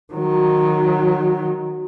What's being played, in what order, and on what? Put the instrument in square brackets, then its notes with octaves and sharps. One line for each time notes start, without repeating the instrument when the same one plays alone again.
[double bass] D#3 F#3